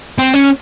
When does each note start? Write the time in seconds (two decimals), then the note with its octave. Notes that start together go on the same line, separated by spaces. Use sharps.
0.18 C4
0.34 C#4